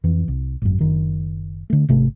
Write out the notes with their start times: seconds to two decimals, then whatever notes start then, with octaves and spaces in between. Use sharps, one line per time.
0.04 F2 E3
0.28 C2
0.62 G#1 F#2
0.79 F#1 D#3
1.70 D3 A3
1.89 G#1 C3 A3